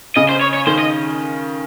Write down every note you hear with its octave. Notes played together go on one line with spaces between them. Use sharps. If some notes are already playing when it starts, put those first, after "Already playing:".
C#3 D#5
C5
C#5
C#5
D#3 C5
D#5